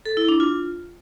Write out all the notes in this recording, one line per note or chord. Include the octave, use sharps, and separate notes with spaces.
A4
E4
D4
F4